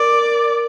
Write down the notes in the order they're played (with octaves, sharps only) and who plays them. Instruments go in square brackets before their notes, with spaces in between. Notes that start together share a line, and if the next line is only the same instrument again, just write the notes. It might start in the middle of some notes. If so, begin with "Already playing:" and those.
Already playing: [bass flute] A#4 [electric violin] D5